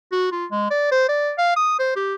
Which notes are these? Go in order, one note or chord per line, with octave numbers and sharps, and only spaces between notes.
F#4
F4
G#3
D5
C5
D5
F5
D#6
C5
G4